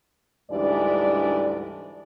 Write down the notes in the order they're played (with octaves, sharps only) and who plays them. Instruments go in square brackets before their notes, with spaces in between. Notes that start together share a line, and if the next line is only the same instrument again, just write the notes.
[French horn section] D2 G#2 E3 G3 D4 D5